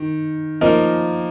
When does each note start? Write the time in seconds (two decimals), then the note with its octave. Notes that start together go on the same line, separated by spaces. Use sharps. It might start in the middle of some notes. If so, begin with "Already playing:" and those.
Already playing: D#3
0.61 F3 A#3 D#4 A#4